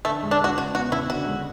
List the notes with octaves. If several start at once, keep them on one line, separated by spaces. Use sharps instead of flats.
D3 A3
G#3
D4
G#3 F#4
C#3 F#4
B3 F#4
C#3 E4
D3 F#4
G#3